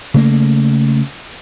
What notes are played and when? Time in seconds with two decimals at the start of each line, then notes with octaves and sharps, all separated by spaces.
0.14 C#3 A3 A#3